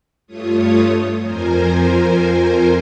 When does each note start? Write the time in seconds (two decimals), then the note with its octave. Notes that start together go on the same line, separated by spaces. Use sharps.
0.27 G2 A3 F4 C#5 D#6
1.19 F2 F3 A#4 C5 G#5 A#5